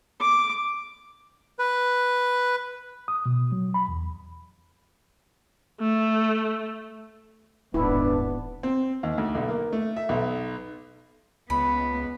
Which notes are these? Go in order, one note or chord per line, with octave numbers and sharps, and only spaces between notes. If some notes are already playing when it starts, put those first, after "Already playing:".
D6
B4
D#6
B2
F#3
B5
E2
A3
D#1 G#1 B3 D4 E4
C4
D#2
D2
B1
A#3
A3
E5
B1
C#2 B3 B5